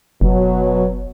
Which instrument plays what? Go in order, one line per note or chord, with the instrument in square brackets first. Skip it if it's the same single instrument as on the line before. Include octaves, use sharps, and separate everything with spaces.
[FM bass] F#1 [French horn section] B2 F#3